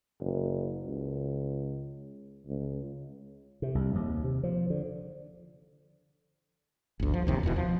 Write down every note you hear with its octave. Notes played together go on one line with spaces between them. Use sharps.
F#1
C#2
C#2
C3
C2
D#2
C3
F3
D3
G1 D2
F3
F#1 D#2 C3
E1 E2 B2 E3
F3